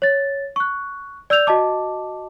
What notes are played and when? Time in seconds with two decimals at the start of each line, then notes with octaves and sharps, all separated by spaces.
0.02 C#5 A6
0.56 C#6 F#6
1.30 D5 E6 G6 F7
1.47 F#4 D#5 A5 D6